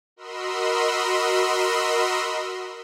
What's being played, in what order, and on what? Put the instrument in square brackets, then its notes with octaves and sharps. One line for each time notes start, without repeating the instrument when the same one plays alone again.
[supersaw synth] F#4 A#4 D#5 B5 C6 E6